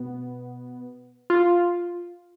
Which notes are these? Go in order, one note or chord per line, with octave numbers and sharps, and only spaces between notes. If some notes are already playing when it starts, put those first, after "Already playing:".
Already playing: B2 B3
F4